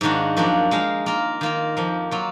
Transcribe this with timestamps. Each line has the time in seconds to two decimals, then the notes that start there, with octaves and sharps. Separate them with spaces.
0.01 G#2 D#3 A#3 D4 F#4
0.37 F#2 F3 A#3 D4 F#4
0.71 G#3 D#4 A#4 F5
1.06 A#3 F4 A#4
1.41 D#3 A#3 F4 A#4
1.77 F2 F3 A#3
2.11 F#3 A#3 F4